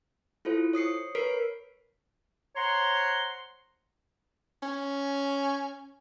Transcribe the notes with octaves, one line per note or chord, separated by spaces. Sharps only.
E4 F4 A4 C5
C#5 D#6 C7 C#7
A#4 B4 C#5 B6 C7 D7
C5 C#5 F#5 A#5 C6
C#4